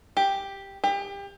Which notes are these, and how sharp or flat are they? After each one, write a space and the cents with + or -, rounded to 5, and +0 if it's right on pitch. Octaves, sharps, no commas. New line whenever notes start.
G4 +5
G4 +30